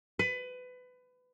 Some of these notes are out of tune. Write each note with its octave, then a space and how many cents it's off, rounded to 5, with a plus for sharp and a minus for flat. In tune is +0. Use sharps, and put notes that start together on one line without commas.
B4 +25